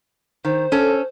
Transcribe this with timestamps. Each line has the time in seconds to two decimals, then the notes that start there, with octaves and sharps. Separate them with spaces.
0.45 D#3 C5
0.72 C#4 A4